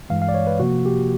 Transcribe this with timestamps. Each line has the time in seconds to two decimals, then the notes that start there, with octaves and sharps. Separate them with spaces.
0.10 G2 E3 G#3 F5
0.22 F5
0.29 D5
0.34 C#5
0.47 B4
0.60 C3 F3 A#3 F#4
0.86 G4